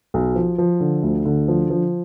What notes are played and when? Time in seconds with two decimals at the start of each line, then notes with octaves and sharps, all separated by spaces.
0.14 B1
0.35 F3
0.58 F3
0.80 D3
1.03 D2
1.25 D3
1.48 F3
1.70 F3